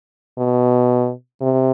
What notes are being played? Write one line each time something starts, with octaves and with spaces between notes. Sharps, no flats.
B2
C3